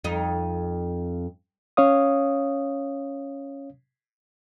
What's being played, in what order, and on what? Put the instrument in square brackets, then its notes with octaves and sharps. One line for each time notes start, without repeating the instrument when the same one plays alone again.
[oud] F2 D#4
[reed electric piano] C#4 C#5 F5 D#6